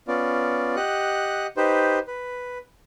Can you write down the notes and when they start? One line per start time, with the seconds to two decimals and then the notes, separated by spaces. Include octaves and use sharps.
0.08 B3 C#4 F4 D5
0.76 G4 D#5 F#5 F#6
1.57 D#4 G4 B4 C5
2.07 B4